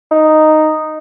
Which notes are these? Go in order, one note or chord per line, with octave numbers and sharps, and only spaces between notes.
D#4